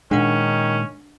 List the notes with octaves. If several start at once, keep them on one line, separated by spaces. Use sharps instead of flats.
A#2 D#3 G#3 C#4 D4 F#5